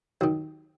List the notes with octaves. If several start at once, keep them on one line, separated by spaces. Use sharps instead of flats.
D#2 D#3 F#3